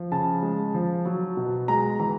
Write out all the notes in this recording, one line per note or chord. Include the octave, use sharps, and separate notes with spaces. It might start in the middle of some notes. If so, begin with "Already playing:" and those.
Already playing: F3
C#3 A5
G#3
F3
F#3
B2
G#3 A#5
E3 A#5